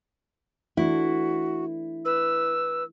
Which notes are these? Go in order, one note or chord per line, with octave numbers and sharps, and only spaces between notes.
E3 A3 D4 E4 F#4
B4 E6